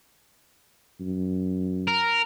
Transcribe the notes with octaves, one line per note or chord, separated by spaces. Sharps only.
F#2
A#4